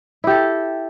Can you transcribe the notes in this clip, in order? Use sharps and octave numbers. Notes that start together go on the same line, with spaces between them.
E4 G4 A4